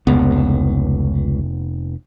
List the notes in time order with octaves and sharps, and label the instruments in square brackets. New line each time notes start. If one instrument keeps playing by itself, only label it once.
[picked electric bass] F1 F#2 B3 [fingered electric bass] C#2